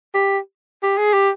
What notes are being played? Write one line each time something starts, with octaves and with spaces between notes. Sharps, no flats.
G4
G4
G#4
G4